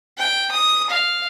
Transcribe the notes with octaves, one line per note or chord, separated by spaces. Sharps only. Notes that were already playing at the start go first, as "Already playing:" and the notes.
G5
D#6
F5